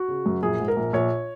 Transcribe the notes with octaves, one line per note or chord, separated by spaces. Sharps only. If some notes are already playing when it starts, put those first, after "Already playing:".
Already playing: F#4
C#3
F#2
A#1 G#4
G#2
A#4
A#1
A#1 C#5